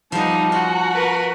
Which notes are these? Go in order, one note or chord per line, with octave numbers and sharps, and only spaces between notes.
F3 G3 B3 D#4 A5
F4 F#4
A#4 B4